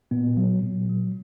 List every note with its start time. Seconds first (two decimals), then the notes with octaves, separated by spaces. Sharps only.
0.11 A#2 B3
0.37 F#3
0.63 A#2
0.90 F#3